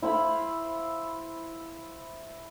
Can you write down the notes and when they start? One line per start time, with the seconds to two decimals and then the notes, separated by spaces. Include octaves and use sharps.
0.02 E4 C5 F5 B5